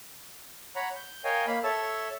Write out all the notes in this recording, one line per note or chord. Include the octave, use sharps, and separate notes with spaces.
C#5 F#5 A#5 B5
G6
A#4 C#5 D#5 F5 G5 G#5
A#3 F5 B5
A4 C#5 E5 A5 E6